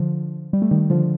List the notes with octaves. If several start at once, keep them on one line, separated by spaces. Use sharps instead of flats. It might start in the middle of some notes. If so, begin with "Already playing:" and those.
Already playing: D3 F3
G3
A3
D#3 G3
D3 F3